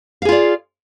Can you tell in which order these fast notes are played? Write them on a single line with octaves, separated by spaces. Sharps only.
F5 G#4 F4 D5